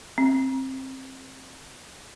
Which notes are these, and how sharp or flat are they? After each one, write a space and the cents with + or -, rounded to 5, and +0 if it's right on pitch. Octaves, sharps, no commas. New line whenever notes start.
C4 +20